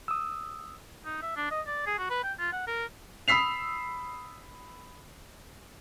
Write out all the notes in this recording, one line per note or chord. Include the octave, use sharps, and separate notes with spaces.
D#6 E6
D#4
E5
D4
D#5
D5
G#4
F#4
B4
G5
F4
F#5
A#4
B5 D#6 E6 B6 C7 F7